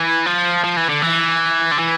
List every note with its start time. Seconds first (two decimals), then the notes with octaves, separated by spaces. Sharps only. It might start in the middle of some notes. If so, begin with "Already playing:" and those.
Already playing: E3
0.26 F3
0.64 F3
0.76 E3
0.89 D3
1.02 E3
1.72 D3
1.79 E3